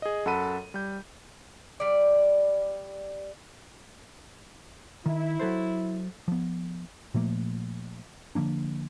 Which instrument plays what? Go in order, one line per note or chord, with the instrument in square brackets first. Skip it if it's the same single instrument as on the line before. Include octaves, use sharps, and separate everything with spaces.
[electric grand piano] G#4 D#5
F#2 A4 F#5 A5 B5 D#7
G3 G6
[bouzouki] G3 D5
[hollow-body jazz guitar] D#3 [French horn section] E4
[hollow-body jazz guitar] F#3 A4 C5
[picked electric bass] F3 B3
A#2 F3 A3 A#3
D3 F3 A#3 D4